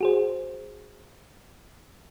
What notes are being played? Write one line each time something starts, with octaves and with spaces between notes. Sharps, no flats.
F#4 G#4 C5